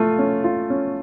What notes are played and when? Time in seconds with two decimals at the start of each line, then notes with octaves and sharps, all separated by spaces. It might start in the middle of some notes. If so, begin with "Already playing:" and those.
Already playing: A3 F4
0.19 C#4
0.44 F4
0.70 C#4